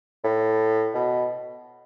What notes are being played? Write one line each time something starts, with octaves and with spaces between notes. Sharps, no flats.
A2
B2